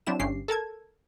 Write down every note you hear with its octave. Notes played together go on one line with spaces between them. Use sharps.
F#3 C4 D4 E4 E7
G1 G2 C#4 G4 C7
A4 A#4 A5 G#6